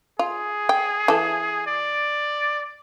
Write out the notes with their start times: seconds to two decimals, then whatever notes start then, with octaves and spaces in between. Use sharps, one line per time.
0.19 F4 G#4
0.69 G5
1.08 E3 A4
1.67 D5